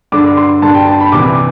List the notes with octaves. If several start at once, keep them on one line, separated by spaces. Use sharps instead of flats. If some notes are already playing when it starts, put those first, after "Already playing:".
G2 D3 D6
C6
G2 D3 A5
G5
A5
B5
C2 C3 E3 D6